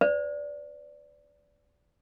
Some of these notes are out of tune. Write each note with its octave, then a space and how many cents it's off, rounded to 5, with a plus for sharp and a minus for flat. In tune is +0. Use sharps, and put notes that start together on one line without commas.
B4 +40 D5 -15